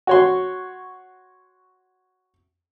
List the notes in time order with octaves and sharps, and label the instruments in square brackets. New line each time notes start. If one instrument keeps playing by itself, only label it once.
[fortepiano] F#4 C#5 C6